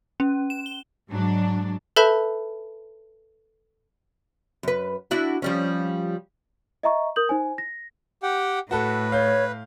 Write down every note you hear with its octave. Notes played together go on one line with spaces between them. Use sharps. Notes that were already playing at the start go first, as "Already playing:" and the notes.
C#4
E7
G7
G#2 F#3 D4
A4 B4 E5 A5 B5 G6
F#2 B4
D4 E4 F#4
F3 G3 C#4
D#5 E5 A#5 C#6
A#4 D#6 G6 F#7
D#4 C5 G#5
A#6
G4 F#5 G5
A2 F#4 A4 B4
C#5 F5 G6